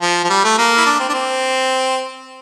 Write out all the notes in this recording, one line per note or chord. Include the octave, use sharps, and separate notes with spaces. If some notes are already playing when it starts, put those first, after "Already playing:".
F3
F3
G3
A3
A#3
E4
D4
C4
D4
C4